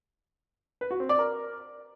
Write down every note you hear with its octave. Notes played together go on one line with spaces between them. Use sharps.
B4
F#4
C4
D5
A#4